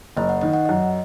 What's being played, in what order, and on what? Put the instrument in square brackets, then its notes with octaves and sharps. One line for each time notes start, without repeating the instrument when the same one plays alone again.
[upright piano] F#1 [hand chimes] D#5
[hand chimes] F#5
[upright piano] D#3 [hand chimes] D#5
[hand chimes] F#5
[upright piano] F#2 [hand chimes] D#5